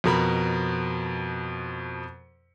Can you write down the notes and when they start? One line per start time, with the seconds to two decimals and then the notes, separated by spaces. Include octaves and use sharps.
0.04 F2 B2 A#4 B5